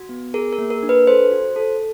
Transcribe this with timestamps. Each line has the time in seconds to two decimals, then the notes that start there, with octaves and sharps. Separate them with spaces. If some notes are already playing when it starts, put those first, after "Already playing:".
Already playing: F#4
0.09 B3
0.34 G#4 A#4
0.53 A#4
0.58 A#3
0.70 A#4
0.83 D4
0.89 B4
1.07 A4 C5
1.32 F#4
1.56 A4